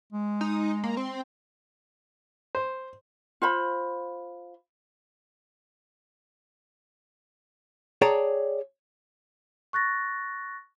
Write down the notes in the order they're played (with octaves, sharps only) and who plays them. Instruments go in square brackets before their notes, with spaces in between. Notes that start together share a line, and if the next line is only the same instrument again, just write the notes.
[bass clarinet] G#3
[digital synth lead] D#4
A#3
C4
[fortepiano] C5
[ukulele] F4 C5 B5
[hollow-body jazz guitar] G#4 C#5 D5 G5 A5 A#5
[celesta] C#6 F#6 A6 A#6